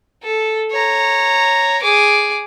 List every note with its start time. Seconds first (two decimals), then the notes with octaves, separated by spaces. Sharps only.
0.23 A4
0.71 C#5 A#5
1.82 G#4 D6